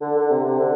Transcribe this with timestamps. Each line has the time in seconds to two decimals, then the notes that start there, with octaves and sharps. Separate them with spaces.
0.02 D3
0.17 D3
0.30 C3
0.45 C3
0.59 D3